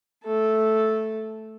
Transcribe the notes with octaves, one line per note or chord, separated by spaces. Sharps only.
A3 A4